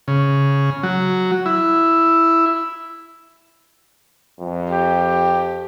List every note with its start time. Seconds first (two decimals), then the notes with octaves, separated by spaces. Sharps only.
0.08 C#3
0.83 F#3
1.46 E4
4.40 F2
4.70 G4